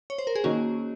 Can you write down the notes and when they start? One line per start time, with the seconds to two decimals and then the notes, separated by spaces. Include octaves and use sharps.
0.10 C#5
0.18 C5
0.27 A#4
0.35 G#4
0.44 D#3 A#3 C#4 F#4